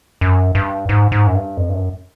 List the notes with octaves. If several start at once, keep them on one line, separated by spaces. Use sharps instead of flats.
F#2
G2
G#2
G#2
F#2
G2
F2
G2
F#2